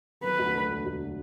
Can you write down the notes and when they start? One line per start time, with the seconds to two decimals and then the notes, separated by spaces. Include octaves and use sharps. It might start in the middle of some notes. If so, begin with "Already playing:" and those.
0.24 F#3 B4
0.39 D2
0.54 D3
0.70 E1
0.86 D2